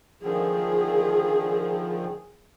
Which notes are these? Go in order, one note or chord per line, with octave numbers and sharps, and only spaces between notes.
D3 D#3 F3 G#4